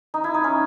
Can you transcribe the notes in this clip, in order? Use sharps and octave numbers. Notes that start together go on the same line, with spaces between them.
D#4
E4
D#4
C#4